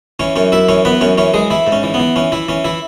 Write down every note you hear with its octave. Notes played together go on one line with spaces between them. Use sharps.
E3 C#4 C#5
F#2 C#4 C#5
F#2 E4 E5
E3 C#4 C#5
E3 B3 B4
F#2 C#4 C#5
E3 C#4 C#5
E3 G#3 G#4
E3 E4
G#2
C#4
E3
B3
E3
E3 C#4
E3 E4
E3 C#4
E3 E4